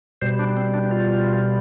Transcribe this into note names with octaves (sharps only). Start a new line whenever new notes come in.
B2 G3 C5
D4
C4
D4
F4